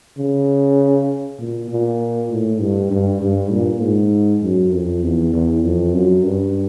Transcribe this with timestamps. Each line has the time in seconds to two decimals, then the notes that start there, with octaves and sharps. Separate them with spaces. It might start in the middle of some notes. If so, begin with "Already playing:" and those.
0.18 C#3
1.39 A#2
1.70 A#2
2.31 A2
2.61 G2
2.91 G2
3.21 G2
3.52 A#2
3.82 G#2
4.43 F#2
4.73 F2
5.03 E2
5.34 E2
5.64 F2
5.95 F#2
6.25 G2